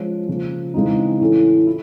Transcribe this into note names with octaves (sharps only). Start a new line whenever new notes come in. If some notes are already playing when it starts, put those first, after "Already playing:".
Already playing: F3 G#3 C#4
C#3 F3 A#3
C#3 E3 G#3 C4 D#4
A2 E3 A3 C#4 E4
E4